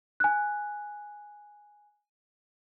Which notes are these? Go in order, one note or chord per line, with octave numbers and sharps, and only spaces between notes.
G#5 F#6